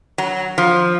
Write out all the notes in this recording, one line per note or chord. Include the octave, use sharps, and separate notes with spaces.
F#3
F3